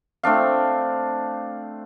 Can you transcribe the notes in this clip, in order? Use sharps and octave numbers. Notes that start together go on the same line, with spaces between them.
A3 C4 D4 F5